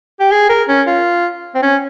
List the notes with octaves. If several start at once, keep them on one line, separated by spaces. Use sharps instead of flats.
G4
G#4
A#4
C#4
F4
C4
C#4